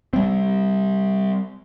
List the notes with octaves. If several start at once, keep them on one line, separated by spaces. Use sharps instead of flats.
G3 C4